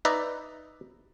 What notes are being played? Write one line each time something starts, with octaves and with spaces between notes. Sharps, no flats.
D#4 B4 D5 E5 A#5